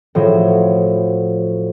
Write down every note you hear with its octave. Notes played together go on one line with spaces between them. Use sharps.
A2 F3 F#3